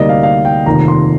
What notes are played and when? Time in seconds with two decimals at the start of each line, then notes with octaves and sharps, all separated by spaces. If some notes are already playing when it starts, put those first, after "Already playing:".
Already playing: D2 C3 G3 A#3 D#4 D5 D#5
0.09 F5
0.23 F5
0.45 G5
0.66 F1 D#2 D#3 A#5
0.88 C6